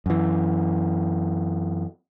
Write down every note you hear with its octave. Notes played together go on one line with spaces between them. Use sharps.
F#2 E3